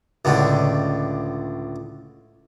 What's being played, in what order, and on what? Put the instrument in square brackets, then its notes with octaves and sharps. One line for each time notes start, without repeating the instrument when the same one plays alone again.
[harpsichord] C#2 A2 D3